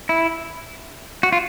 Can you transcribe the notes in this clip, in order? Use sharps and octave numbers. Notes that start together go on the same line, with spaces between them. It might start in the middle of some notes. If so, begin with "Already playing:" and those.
E4
F#4
F4